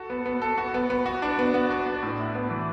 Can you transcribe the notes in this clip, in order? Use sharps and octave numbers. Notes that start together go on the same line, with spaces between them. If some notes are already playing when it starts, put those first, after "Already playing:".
Already playing: F#4 A4
B3
B3
A4
F#4
B3
B3
F#4
D4
B3
B3
F#4
D4
A2
E4
B3
E3